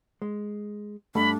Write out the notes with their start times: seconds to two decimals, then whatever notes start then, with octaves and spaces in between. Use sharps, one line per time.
0.22 G#3
1.15 G2 G3 A3 D4 B5